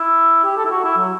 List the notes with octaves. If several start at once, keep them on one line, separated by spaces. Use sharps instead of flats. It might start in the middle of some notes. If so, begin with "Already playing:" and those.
Already playing: E4
G4
A4
E4
F#4
E4
F#3